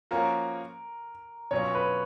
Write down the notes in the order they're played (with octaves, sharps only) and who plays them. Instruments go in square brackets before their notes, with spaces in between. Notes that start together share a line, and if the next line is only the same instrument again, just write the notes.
[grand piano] F3 A#3 C#4 F#4 [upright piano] A#4
[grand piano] B2 F#3 C#4 F4 [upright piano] C#5
[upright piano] B4